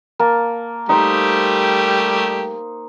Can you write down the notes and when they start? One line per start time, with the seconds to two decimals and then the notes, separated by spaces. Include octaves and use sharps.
0.19 A#3 A5
0.89 G3 A3 D#4 G4 C5